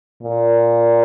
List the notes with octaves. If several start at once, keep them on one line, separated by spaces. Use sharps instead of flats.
A#2